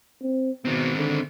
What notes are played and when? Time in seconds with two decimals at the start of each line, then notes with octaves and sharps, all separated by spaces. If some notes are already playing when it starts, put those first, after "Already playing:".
0.21 C4
0.65 B2 D#3 C4
0.95 D3